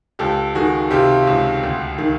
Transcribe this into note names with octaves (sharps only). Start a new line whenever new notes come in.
C#2 G4 A4
D#3 F#4 G#4
C3 F4 G4
C#2
D2
D#3